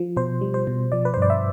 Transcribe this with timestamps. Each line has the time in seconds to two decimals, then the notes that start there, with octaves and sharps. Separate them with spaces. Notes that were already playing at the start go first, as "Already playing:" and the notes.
Already playing: F3
0.17 B2 C5
0.41 G3
0.54 C5
0.67 B2
0.92 F3 D5
1.05 B4
1.14 C5
1.17 G2 D5
1.30 E5